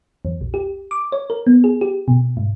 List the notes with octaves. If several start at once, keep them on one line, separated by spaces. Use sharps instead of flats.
E2
A#1
G4
D6
C#5
A#4
B3
G#4
G4
B2
G#2